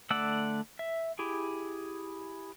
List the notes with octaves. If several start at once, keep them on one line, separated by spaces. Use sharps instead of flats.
D3 A3 D5 F#5 E6
E5
E4 G4 G#4